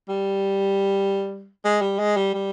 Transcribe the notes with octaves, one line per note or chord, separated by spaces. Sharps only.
G3
G#3
G3
G#3
G3
G3